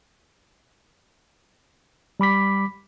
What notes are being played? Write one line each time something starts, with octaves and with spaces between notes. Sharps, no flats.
G3 B5 D6 B6